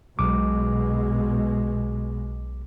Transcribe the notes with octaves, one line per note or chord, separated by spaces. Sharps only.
B1 B2 G#3 D6